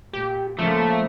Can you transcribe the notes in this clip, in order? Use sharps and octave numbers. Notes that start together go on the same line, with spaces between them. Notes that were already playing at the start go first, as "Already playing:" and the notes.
A#2 G4
A#2 C#3 F3 A3 A#3